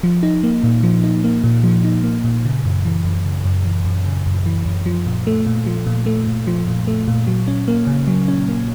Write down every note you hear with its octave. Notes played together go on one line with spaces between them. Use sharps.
F3
D#4
A#3
A#2
F3
D#4
A#3
A#2
F3
D#4
A#3
A#2
C#3
F#2
E3
F#2
C#3
F#2
E3
F#2
C#3
F#2
E3
F#2
F3
A#2
A3
A#2
F3
A#2
A3
A#2
F3
A#2
A3
A#2
F#3
C#4
A#3
C#3
F#3
C#4
A#3